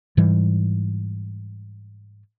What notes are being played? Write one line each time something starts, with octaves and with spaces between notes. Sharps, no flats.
G#2 E3 G3